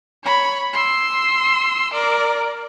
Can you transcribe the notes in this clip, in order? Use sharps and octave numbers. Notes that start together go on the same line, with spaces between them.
C#5 B5
C6 E6
A#4 D5